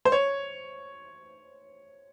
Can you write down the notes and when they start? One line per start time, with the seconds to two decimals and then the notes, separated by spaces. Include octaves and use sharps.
0.05 C5
0.12 C#5